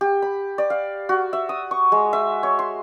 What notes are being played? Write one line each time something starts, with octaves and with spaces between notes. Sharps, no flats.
G4
B5
D5
F5
F#4
E5
D#6
C#6
G#3
E5
C#5
C6